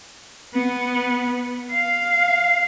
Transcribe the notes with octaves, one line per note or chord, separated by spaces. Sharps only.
B3
F5